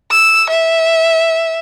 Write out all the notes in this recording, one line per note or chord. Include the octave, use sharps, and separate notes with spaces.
E6
E5